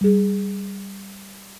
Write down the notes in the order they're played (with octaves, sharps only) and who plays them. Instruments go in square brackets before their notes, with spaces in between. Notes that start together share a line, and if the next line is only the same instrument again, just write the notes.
[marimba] G3 G#4